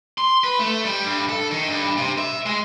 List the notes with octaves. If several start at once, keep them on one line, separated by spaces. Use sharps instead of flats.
C6
B4
A3
G3
G2
A4
D#3
G2
C3
E5
G#3